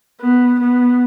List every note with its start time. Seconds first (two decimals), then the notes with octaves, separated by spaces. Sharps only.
0.20 B3
0.60 B3